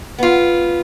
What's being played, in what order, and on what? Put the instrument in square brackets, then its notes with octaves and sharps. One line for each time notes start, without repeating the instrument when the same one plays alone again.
[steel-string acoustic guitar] B3 F4